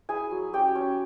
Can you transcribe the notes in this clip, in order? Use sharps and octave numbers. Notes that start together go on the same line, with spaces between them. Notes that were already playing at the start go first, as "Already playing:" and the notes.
E4 G#4 G#5
F#3
C#4 G4 G5
C#4